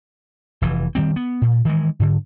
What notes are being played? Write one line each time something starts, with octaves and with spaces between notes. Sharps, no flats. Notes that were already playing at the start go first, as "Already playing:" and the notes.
F1 E3
D#3 G3 C4
B3
A#2
D#3 E3 G#3
G#2 D3